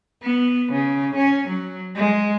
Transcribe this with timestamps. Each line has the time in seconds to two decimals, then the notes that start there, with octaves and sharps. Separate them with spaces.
0.22 B3
0.71 C#3
1.15 C#4
1.48 F#3
1.96 G#3